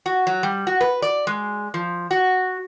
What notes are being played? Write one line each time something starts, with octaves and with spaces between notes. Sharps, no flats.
F#4
F#3
G3
F#4
B4
D5
G#3
F3
F#4